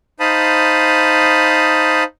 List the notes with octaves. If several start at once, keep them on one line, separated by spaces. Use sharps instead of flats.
D#4 C5 F5 A5 B5 D#6